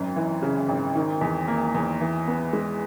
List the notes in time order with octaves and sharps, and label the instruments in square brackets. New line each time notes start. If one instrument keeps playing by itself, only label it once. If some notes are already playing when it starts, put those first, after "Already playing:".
Already playing: [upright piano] G#1 F#2
E3
C#3
G#1
D#3
E2
A#3
E2
E3
B3
G#3